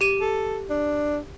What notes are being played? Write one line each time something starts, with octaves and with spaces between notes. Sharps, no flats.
G4 D#7
A4
D4